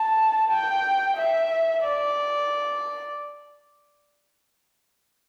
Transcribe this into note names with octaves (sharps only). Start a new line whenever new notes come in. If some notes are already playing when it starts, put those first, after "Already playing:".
Already playing: A5
G5
E5
D5